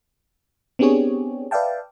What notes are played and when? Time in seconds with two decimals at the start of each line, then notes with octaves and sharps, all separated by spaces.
0.79 B3 C4 D4 G4 G#4 C#5
1.51 B4 D5 E5 F5 G5 A5